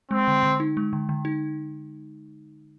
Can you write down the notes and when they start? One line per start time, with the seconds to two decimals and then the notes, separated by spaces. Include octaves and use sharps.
0.11 G#3 C4
0.28 D3
0.43 D3
0.60 D#4
0.77 G#3
0.93 D3
1.09 D3
1.25 D#4